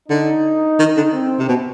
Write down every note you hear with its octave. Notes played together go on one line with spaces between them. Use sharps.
D3 D#4
D#3
D3
C4
C3
B2